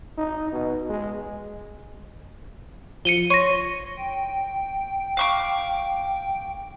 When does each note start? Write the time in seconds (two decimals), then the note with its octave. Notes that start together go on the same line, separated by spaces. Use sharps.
0.17 D#4
0.52 B2
0.89 G#3
3.05 F3 C#7 D#7 G7
3.30 C#5 C6 C#6 A#6 D#7
3.98 G5
5.17 F5 C#6 D6